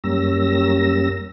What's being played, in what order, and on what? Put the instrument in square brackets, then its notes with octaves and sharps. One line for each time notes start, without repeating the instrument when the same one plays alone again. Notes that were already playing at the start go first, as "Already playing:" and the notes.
[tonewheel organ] F#2 G3 A#3 C#4 E6 A#6